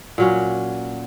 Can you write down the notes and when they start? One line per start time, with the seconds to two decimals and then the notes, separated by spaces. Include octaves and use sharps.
0.18 A#2 F#3 C#4